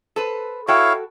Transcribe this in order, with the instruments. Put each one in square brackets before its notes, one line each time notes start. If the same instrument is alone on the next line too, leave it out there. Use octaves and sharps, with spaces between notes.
[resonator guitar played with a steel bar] A4 B4 C5
[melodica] E4 C#5 F5 [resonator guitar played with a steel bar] F#4 A4 G5